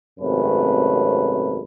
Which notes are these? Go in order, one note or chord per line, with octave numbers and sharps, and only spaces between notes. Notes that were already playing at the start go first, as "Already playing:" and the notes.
G#1 F#2 C3 A3 C#4 B4